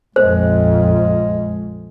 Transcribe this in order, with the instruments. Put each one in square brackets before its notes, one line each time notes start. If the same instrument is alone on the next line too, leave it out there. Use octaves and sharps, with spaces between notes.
[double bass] A#1 F2 [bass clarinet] G#3 [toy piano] C5